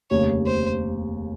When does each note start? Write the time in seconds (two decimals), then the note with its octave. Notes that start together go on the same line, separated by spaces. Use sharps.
0.10 F1 D#2 C#3 C#5
0.47 C5